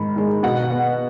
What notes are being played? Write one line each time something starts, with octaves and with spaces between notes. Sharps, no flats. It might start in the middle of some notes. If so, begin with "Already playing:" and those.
Already playing: G#2 D#3 G#3 B5
D#3 G#3
B2 F#5
B3